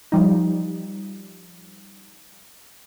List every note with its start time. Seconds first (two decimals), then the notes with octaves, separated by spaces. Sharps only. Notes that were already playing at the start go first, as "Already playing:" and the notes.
0.12 F3 G3 D#4